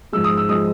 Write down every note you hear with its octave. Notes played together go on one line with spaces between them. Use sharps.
G#2 F3 G#3 E6
D#6
E6
F3 G#3 D#6